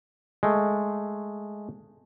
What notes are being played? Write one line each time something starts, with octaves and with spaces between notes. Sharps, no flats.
G#3 A3